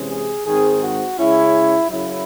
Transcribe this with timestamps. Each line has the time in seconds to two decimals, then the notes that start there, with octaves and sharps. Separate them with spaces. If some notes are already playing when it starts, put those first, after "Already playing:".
Already playing: C3 E3 G#3 C#4
0.09 G#4
0.46 G#2 D#3 G#3 C4 G#4
0.83 F#4
1.19 C#3 G#3 C#4 E4
1.91 F#2 C#3 F#3 E4